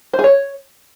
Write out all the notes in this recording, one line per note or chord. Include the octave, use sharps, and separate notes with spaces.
C5
G#4
C#5